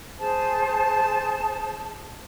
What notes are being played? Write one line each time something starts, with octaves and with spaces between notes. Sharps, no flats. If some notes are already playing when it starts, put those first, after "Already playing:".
G#4 C5 A5